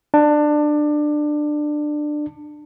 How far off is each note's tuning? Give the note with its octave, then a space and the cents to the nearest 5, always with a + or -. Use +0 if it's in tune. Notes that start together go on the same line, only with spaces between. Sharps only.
D4 +20